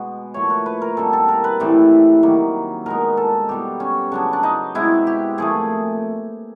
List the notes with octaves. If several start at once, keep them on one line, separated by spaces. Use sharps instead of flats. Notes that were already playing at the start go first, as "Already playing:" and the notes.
Already playing: B2 G#3 B3
A#2 F3 A3 C#5
B4
B4
A#4
B2 G3 C4 A4
A4
A#4
B4
A2 E3 G3 C4
D#3 F#3 A#3
B2 G#3 B3 A#4
A4
B2 G3 B3 G4
C#4
C#3 F#3 B3 D4
D4
D#4
B2 G#3 C4 E4
G4
A#2 F3 A3 G#4